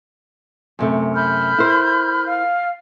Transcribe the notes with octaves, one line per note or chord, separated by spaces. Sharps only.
F#2 C3 A3
B5 F6 G6
E4 A#4 C5
F5 F6